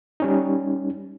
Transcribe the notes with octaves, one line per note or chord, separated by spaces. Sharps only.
G3 C#4 D#4